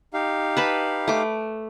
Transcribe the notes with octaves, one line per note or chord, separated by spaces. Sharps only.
D#4 G4 F5
B4 A5 B5
A3 D6